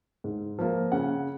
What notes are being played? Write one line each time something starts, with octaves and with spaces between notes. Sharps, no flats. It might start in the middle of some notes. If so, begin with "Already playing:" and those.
G#2
F3 A#3
C#3 F#5